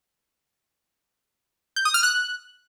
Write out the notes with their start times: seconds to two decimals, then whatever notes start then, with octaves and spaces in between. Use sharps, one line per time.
1.76 G6
1.85 D#6
1.94 F6
2.03 F#6